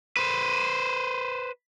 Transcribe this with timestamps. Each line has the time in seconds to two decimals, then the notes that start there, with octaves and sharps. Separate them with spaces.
0.17 B4 C5